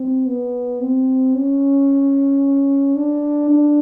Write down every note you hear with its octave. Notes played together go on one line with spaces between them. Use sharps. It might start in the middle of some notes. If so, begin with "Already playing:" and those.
Already playing: C4
B3
C4
C#4
D4
D4